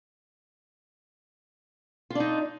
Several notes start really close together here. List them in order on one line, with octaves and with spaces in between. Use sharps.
F4 D4 D#4